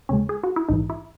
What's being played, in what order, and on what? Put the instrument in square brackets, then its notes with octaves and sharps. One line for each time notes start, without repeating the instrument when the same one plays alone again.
[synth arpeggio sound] D#2 C#3 G#3 C#4
G#4
F#4
E4
A#1 G#2 E3 D#4
E4